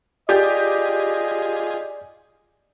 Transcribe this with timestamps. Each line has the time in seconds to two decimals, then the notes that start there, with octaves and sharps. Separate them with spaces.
0.29 F4 G4 G#4 D5 D#5 G#5